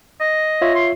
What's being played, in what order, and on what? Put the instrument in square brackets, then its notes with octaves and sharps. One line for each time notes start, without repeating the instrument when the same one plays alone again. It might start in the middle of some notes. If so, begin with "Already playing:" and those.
[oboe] D#5
[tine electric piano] F4 C#5 E5
[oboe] C6